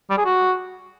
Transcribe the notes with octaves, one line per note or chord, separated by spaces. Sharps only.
G3
G#4
F#4